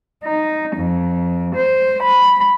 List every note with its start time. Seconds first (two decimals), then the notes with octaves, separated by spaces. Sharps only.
0.23 D#4
0.76 F2
1.56 C5
2.03 B5